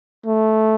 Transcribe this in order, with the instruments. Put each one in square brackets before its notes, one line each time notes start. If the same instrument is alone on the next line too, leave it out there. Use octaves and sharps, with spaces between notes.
[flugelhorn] A3